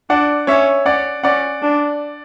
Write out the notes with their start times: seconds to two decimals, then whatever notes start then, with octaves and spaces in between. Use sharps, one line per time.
0.09 D4 D5 F#5
0.47 C#4 C#5 E5
0.86 C#4 D5 F#5
1.23 C#4 D5 F#5
1.62 D4